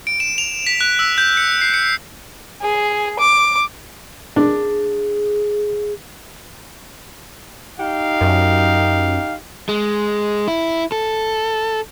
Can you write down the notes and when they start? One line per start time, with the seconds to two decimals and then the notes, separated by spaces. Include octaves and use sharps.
0.07 D7
0.20 E7
0.38 F7
0.67 B6
0.81 F#6
0.99 E6
1.18 G6
1.37 C#7
1.61 C7
1.74 C#7
2.62 G#4
3.19 D6
4.36 D4 G#4
7.79 D#4 G4 F5
8.21 F#2
9.69 G#3
10.48 E4
10.92 A4